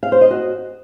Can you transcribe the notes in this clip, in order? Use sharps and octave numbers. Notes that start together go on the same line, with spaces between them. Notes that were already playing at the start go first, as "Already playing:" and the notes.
F5
C5
D#5
F#4